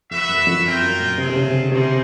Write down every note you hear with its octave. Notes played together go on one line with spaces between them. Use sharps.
F2 F#4 B4 E5
F#2
F2
F4 A#4 D#5 G5
F#2
A#2
C3 A3 C4 F4 G#4
C3
C#3
D3
C3 G3 A#3 D#4 G#4 C5